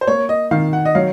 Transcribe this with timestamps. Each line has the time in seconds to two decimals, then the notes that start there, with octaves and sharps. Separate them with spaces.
0.01 C5
0.07 A#3 C#5
0.29 D#5
0.51 D#3 F5
0.73 F#5
0.85 D#5
0.95 F#3 F5